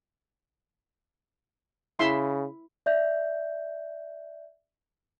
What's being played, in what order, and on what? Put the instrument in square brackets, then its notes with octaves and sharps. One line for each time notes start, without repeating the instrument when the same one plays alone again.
[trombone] C#3 [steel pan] E4 E5 C6
[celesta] D5 E5 G6